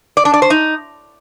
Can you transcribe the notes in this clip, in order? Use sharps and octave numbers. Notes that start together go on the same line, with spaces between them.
D5
D4
D5
C5
D#4